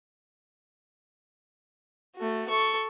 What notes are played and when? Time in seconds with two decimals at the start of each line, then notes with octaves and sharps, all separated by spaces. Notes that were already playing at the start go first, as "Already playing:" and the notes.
2.16 A3 F#4
2.48 A4 C#6